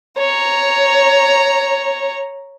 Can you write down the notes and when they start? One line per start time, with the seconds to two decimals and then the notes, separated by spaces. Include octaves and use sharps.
0.18 C#5 A#5